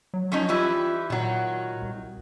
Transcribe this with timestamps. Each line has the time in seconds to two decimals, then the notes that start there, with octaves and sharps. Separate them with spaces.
0.14 F#3
0.32 F3 C#4 D#4
0.49 E3 G3 E4 F4
1.10 A#2 D#3 F#3
1.82 C2